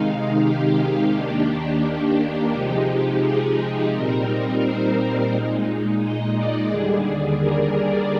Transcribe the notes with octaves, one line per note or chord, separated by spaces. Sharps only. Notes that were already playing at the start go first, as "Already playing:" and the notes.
Already playing: C3 D#3 G#3 D#4 F5
G4
D#2 D#3 A#3 D4 G4
C3 F3 G#3 D#4
G#4
A#2 G3 C4 D#4 A#4
C5
A#2 G#3 D#4
D#5
D5
D#2 D3 G3 D4 G#4
A#4
D5